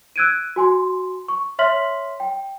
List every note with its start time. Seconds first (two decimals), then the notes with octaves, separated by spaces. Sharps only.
0.16 E6 F#6 G#6 D7 D#7
0.56 F#4 G#5 C6
1.28 C#6
1.59 C#5 E5 C6 F6 B6 F#7
2.20 G5